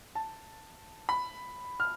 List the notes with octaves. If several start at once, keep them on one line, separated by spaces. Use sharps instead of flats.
A5
B5
F6